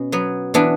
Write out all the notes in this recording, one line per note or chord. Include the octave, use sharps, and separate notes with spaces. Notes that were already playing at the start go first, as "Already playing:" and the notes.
Already playing: B2 C#4
F#3 B3
E3 B3 D4